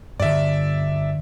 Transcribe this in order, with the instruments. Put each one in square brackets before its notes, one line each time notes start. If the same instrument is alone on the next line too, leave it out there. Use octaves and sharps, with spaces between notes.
[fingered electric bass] G2 D3 [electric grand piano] D5 E5